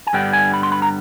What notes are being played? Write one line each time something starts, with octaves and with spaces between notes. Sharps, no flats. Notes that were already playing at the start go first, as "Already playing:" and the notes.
G#5
G2 D3 G3 B3 G5
G#5
B5
C6
B5
A#5